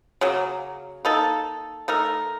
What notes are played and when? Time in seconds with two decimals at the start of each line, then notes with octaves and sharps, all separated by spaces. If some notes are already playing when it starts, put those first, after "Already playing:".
0.21 C#3 F#3 A#3
1.05 A#3 D#4 A4
1.88 A3 D#4 A#4